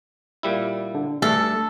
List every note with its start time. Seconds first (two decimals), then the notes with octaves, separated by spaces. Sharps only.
0.43 A#2 G3 E4
0.94 D3
1.22 G2 A3 A4